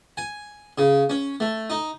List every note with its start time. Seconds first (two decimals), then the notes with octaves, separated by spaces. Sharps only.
0.17 G#5
0.78 C#3
1.10 C#4
1.40 A3
1.70 D#4